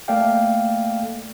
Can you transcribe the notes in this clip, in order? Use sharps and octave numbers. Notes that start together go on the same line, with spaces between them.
A3 A#3 A4 D5 F5 G5